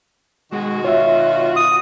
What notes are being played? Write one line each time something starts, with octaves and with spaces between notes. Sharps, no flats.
B2 D#3 G#3 F#4
F4 C#5 E5
D#6